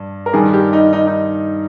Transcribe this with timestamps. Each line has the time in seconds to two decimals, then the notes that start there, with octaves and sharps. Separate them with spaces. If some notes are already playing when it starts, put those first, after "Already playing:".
Already playing: G2
0.26 A#4
0.33 G2 D#3 G3 G#4
0.53 G4
0.73 D#4
0.93 D#4
1.07 D#4